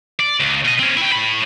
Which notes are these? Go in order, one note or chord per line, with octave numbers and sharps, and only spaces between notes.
D5
C#2
B2 D#5
C4 C#4
E4 G5
A2 B5